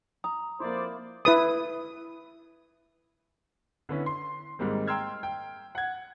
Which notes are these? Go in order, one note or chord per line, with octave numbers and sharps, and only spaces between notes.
A#5 D#6
F2 A#3 E4 C5 D5
E4 B4 D#6
D3 B3 C#4 E4
C6
G#2 D#3 G3 G#3 A#3 C4
G5 A#5 C6 E6 F6 G#6
G5
F#5 G#6